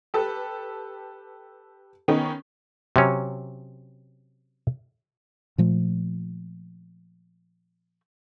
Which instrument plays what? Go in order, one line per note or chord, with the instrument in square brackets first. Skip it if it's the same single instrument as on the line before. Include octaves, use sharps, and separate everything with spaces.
[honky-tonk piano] G4 A4 B4
D#3 B3 C#4 D#4
[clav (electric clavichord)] C3 F#3 C#4
[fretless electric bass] A#2 F3 A3